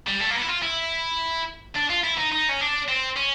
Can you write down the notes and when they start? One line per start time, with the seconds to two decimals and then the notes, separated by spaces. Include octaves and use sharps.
0.07 G3
0.20 A3
0.31 A#3
0.35 B3
0.42 E4
0.48 F4
0.63 E4
1.76 D4
1.90 F4
2.04 E4
2.18 D#4
2.32 D#4
2.49 C#4
2.61 D4
2.88 C4
3.16 C#4